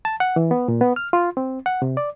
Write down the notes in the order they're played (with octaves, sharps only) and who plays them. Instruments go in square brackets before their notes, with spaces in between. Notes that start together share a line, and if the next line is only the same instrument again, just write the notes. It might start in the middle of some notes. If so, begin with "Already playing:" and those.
[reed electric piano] A5
F#5
E3
B3
A#2
B3
F6
F4
C4
F#5
C3
D5